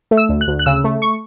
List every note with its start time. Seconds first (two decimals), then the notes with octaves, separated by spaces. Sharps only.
0.11 A3
0.17 E6
0.29 D2
0.41 F#6
0.48 D2
0.59 F#6
0.66 C#3 E6
0.84 A3
1.02 C#6